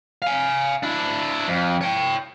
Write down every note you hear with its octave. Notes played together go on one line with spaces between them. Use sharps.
F5 G#5
D4 E4
F2
C#5 G5